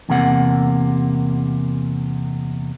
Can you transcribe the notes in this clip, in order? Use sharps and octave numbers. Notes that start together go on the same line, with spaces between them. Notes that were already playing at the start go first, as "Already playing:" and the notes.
E2 C3 A#3 F#5